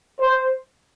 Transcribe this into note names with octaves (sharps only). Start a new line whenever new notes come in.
C5